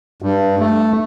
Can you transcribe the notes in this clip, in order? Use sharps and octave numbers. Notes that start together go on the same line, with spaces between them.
G2
A3